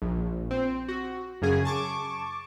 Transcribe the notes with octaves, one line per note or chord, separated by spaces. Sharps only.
A#1
C4
F#4
F#2 C#3 G#4
A5 C#6 D6